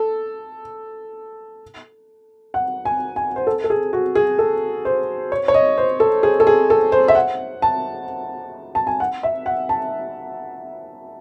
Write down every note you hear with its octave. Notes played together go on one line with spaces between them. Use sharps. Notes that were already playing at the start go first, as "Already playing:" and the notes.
Already playing: A4
F#5
G#5
G#5
C5
A4
A4
G#4
F#4
G#4
A4
C5
C#5
C#5
D#5
C5
A4
G#4
A4
G#4
A4
C5
E5
F#5
A5
A5
G#5
F#5
E5
F#5
A5